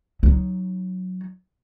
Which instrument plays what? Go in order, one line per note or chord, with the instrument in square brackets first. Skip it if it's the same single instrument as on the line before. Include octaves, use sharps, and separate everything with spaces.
[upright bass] F#3 D#4